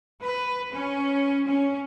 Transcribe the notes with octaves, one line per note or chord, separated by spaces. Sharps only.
B4
C#4
C#4